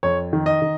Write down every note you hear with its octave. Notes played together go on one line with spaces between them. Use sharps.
F2 C#5
D#3
D#5
D#3